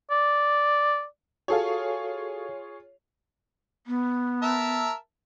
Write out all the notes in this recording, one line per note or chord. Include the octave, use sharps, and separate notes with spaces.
D5
F4 F#4 G#4 A4 C#5 F5
B3
A#4 E5 A5